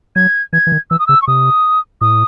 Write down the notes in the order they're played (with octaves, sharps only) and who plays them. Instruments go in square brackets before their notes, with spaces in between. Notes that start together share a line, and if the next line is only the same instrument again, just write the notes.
[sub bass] F#3 [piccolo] G#6
[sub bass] E3 [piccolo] G#6
[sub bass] E3
D#3
[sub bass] E3 [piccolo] E6
[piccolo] D#6
[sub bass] C#3 [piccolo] E6
[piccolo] C#6
[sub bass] C3 [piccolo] D#6
[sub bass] A2 [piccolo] D#6